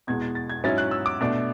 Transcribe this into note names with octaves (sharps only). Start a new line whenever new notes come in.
E2 B2 G#3 G#6
A6
A6
G#6
G#2 F#3 C#4 E4 A6
F#6
E6
D6
B2 A3 D4